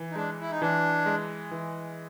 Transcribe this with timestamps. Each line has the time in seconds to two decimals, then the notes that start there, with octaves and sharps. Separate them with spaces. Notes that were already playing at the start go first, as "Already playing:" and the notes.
Already playing: E3
0.11 D#4
0.16 G#3 D4
0.41 E4
0.51 D#4
0.61 E3 D4
1.06 G#3
1.51 E3